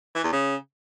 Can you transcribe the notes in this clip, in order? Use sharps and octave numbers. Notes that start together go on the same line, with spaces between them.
E3
E2
C#3